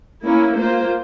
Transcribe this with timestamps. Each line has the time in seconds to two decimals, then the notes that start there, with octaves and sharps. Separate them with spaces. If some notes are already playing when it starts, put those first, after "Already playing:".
0.22 A#3 C#4 E4
0.56 A#3 F4 C5